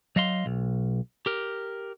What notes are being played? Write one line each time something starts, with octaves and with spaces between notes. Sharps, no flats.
F#3 D#5 F5 C6
B1
G4 A#4